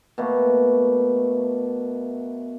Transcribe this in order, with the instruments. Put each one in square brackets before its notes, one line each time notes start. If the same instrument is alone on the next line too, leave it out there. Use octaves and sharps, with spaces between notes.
[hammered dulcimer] B2 A3 A#3